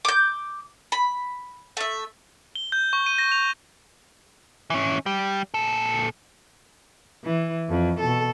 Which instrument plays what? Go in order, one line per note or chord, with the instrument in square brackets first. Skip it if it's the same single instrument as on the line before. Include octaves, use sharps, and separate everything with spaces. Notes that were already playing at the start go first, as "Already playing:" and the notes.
[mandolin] D6 G6
B5
A3 E5
[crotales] G7
G6
C#6
D#7
A#6
F7
[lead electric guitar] E3 C#4
G3
A#2 A4
[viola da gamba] E3
F2
B2 A4